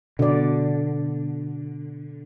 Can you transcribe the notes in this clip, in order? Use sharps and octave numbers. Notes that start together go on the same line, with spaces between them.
B2 D3 D5